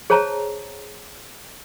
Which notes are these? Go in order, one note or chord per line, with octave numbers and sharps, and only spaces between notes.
G#4 C5 C#5 A5 A#5